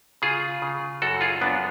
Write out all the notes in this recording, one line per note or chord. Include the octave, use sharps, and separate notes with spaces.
C#3 F4 G#4
C#3
F#2 F#4 A4
F4 G#4
F#2 B3 D4